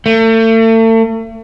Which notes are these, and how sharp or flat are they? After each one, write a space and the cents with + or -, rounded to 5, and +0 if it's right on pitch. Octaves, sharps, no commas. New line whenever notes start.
A3 +40